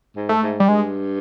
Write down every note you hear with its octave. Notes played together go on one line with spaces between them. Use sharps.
G#2
A3
G#2
G3
G2 G#3